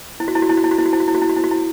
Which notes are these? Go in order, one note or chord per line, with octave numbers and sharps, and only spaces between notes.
E4
F#4
E4
F#4
E4
F#4
E4
F#4
E4
F#4
E4
F#4
E4
F#4
E4
F#4
E4
F#4
E4